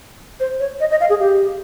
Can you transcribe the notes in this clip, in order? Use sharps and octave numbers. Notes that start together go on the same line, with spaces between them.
C5
C#5
D#5
D#5
F5
G#4
G4